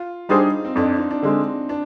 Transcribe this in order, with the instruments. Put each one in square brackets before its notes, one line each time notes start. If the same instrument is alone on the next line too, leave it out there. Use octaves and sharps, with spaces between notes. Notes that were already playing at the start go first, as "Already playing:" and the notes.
Already playing: [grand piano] F4
[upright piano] G3 D4 G#4 C5 [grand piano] D#4
[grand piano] C4
[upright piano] F2 [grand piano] D4
[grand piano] D#4
D4
[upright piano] D3 G#3 [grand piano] C4
[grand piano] D4